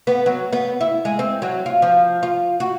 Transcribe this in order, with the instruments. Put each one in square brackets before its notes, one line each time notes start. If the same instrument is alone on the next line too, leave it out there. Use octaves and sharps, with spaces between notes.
[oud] B3
F#3
B3
E4
G#3
C4
F#3
F4
F3
F4
F#4